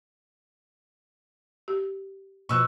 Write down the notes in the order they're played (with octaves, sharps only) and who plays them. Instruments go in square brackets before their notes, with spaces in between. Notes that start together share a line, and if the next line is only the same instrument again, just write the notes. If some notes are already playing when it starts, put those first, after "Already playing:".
[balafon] G4
[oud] B2 F3 [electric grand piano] C#6 E6 F#6